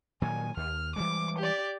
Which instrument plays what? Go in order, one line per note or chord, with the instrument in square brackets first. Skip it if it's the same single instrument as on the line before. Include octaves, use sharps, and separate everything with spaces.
[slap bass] A#2 D#3 F#3 [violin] G#5
[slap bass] D#2 [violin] F6
[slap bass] E3 G3 G#3 [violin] D6
[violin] G4 D5